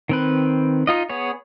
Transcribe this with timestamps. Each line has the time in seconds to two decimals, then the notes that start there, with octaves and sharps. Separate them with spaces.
0.09 D#3 C4 B4
0.87 D#4 F4 D#5
1.09 B3 G#4 C#5